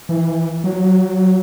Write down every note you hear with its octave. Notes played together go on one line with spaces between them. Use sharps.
E3
F#3